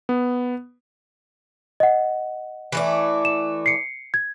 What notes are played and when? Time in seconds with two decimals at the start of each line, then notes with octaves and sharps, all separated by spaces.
0.09 B3
1.80 D#5 F#5
2.72 E3 A3 D5
3.25 E7
3.66 C7 C#7
4.14 G#6